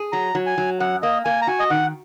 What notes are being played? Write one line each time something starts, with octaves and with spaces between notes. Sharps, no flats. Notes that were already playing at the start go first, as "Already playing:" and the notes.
Already playing: G#4
F#3 A#5
F#3
G#5
F#3
F#2 F#5
A#3 D#5
A#3 G#5
A#5
F#4 G#5
D#5
D#3 F#5